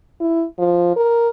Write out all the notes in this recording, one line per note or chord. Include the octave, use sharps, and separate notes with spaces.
E4
F3
A#4